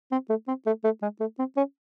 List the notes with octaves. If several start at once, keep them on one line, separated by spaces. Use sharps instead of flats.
C4
A3
C4
A3
A3
G#3
A3
C4
C#4